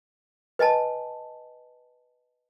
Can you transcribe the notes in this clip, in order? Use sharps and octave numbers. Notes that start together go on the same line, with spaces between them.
B4 D#5 G#5 A5